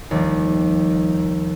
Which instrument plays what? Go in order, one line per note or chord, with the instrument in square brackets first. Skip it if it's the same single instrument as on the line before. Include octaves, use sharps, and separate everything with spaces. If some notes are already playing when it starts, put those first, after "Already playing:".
[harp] D#2 F3 G3